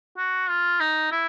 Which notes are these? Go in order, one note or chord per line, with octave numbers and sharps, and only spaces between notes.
F#4
F4
D#4
E4